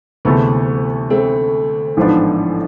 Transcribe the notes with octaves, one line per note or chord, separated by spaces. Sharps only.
D2 C3 E3 G#3 A3 B3
A3 C4
A1 G#2 F3 B3 D4